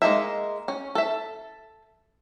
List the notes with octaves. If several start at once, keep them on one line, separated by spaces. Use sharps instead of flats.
G#3 A#3 D#4 E5
C#4
A4 E5